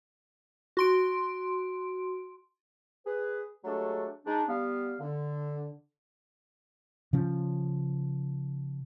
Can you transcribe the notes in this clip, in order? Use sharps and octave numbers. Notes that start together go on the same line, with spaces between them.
F#4 C6 D7
G#4 B4
F#3 G#3 A3 D4 G4 A4
G#3 D4 D#4
G3 B3 F5
D3
C#3 F3 C#4